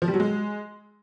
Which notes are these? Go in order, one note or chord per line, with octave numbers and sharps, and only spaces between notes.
F3
G3
F#3
G#3